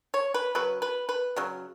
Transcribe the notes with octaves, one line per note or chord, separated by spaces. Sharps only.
C#5
B4
C#3 F#3 B4
B4
B4
C#3 F#3